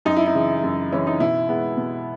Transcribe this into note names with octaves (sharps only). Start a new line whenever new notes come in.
F#2 D#4
E4
D#4
C#3 E3
F#2
C#3 E3 C#4
D#4
B2 E4
G#3 B3
B2